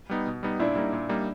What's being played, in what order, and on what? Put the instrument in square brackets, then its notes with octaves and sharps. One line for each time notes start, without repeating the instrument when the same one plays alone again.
[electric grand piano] G3 B3 D#4
B2
G3 B3 D#4
[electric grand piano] A#2 [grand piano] D4 E4
[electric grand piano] G3 A#3 D#4
A#2
G3 A#3 D#4